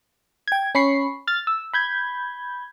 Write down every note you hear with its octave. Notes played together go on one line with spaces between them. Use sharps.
G5 G#6
C#4 B5 C#6 C7
F6 A6
E6
B5 G6 G#6